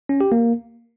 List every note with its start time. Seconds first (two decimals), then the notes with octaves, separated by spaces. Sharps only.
0.09 C#4
0.21 G4
0.32 A#3